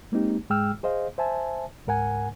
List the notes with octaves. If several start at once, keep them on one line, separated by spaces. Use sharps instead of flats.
G#3 A#3 C4 D#4 G4
G#2 G#3 G#4 G5 E6 F6
G#4 C5 D#5 F5
C5 E5 G#5 A5
C#2 G#2 A#4 F#5 G#5